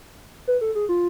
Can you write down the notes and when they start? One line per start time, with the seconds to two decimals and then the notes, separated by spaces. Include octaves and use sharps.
0.48 B4
0.61 A4
0.75 G#4
0.89 F4